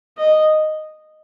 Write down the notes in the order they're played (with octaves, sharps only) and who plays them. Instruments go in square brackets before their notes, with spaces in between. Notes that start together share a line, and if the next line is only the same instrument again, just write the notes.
[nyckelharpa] D#5